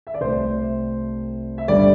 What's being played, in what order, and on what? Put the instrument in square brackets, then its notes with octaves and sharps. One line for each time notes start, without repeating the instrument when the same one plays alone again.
[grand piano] E5
D5
C2 C3 A3 C5
E5
G1 G2 G3 D5